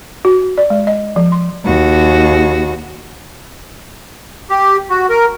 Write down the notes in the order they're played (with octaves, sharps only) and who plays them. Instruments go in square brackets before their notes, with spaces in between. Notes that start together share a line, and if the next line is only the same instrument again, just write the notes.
[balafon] F#4
D5
G#3
D#5
F3
C6
[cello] D#2 F#4
[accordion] G4
F#4
A#4